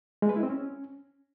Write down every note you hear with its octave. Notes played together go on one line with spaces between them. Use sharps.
G#3
B4
E4
C4
C#4